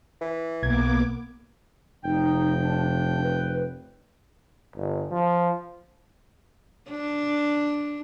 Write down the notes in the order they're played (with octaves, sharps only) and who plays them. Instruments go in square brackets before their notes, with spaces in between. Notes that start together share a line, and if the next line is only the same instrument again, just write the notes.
[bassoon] E3
[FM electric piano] B1 G#6 [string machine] A#3 B3 D6
[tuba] F1 [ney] D#4 [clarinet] G5
[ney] D4
B4
[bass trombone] G1
F3
[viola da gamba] D4